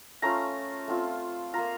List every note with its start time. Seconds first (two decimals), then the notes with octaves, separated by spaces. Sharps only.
0.22 A3 C#4 F4 A#5
0.88 A3 C4 F4
1.54 A#3 F4 A#5